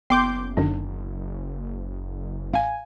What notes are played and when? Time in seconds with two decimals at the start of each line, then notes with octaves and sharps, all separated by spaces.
0.10 F#1 B3 C6 D6 G6
0.57 F#2 D3 D#3 D4
2.54 A1 F5 G#5